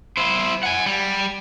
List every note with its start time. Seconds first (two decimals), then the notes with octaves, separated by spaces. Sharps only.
0.17 E4 C5
0.63 F#5 G#5
0.86 G3